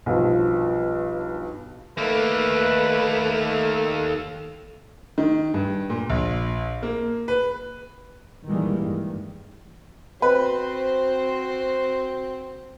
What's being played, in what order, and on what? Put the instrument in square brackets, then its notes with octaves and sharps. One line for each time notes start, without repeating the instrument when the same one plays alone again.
[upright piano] B1 G2 F3
[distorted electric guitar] D#2 A#3 [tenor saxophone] A3 [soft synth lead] A4 [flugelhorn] B4
[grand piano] D#3
G2
A#2
A#1
A#3
B4
[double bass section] A#2 D#3 E3 G3 G#3 A#3
G2 D#3
[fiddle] C4 [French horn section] F#4 C5 [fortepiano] B4